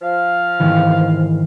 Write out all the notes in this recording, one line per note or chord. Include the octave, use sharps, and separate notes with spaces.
F3 F5
G#2 D#3 E3